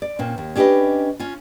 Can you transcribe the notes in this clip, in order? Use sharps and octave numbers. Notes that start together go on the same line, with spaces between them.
D5
A#2 C4 C#4
D#2
C#4 D4 G4 G#4 B4 D#5
C#4 F4